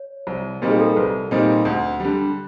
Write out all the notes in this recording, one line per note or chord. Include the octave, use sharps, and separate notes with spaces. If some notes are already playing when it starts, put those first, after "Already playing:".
Already playing: C#5
C2
A#2 G3 C4 D#4
G#4
A4
A#4
C2 B4
A#2 G3 C4 D#4
D2
D3 G3